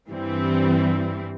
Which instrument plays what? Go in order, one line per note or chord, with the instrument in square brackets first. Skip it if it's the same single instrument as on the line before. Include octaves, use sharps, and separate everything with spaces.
[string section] G2 E3 G3 C4